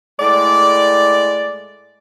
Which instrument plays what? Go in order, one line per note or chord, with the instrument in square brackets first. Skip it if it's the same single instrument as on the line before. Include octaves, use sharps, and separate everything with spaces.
[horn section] A2 G#3 D5